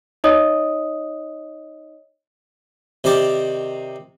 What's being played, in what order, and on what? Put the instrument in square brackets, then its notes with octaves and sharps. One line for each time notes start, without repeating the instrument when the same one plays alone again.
[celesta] D#4 C#5 D#5 D#6
[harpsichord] C3 D#3 C5 D5 D6